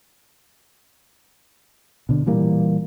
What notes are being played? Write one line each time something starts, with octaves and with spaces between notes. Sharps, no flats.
B2 D3
A#2 E3 G3 A#3